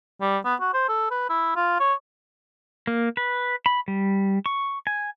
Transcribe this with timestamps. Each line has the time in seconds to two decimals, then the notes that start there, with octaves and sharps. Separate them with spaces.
0.21 G3
0.45 B3
0.60 F#4
0.74 C5
0.89 A4
1.11 B4
1.30 E4
1.56 F4
1.80 C#5
2.87 A#3
3.17 B4
3.66 B5
3.88 G3
4.46 C#6
4.87 G#5